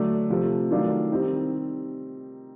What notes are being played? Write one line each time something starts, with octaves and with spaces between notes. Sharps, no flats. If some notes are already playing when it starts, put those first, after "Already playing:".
Already playing: D3 F#3 A3 D4
C3 F3 A3
D#3 F#3 A3 D4 F4
D#3 G3 C4 D#4